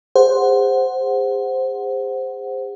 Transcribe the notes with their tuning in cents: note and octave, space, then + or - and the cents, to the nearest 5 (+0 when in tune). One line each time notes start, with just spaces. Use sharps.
G#4 -40 C5 +0 F#5 +0